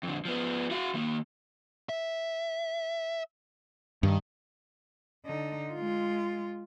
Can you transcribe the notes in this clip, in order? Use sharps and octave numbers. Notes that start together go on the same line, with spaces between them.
F2 D3
F3 B3
F#4 F5
D#3 A#3
E5
G2 D#3
D3 D#4
G#3 F4